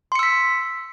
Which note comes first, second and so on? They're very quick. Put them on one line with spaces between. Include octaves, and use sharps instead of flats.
C6 C#7 E6 B6